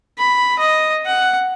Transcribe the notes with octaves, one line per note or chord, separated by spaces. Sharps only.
B5
D#5
F#5